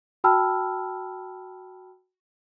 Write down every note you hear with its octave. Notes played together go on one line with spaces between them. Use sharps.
F#4 G5 A5 B5 E6 F6